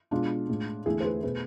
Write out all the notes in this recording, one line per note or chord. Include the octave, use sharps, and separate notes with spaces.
B2 G#3 D4 F4
A2 G#3
E2 D3 A3 E4 G#4
C5
G#4 B4
B2 A3 G#4 B4